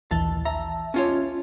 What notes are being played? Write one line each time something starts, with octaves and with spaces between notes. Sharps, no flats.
A#1 D#2 E3 A5
E5 A5 A#5
C#4 F4 C#5